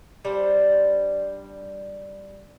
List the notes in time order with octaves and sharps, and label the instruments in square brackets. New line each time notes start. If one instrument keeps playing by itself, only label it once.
[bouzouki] G3 D4 C5